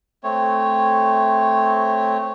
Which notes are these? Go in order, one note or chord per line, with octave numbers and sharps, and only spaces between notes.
A3 C4 C#5